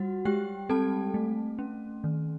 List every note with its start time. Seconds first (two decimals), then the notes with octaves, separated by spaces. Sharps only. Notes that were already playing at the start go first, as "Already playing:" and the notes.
Already playing: G3 F#4 F#5
0.25 G#3 G4 G5
0.69 C4 A4 A5
1.14 A3
1.59 C#4
2.04 D#3